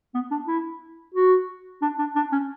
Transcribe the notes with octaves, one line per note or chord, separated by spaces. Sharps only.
B3
D4
E4
F#4
D4
D4
D4
C#4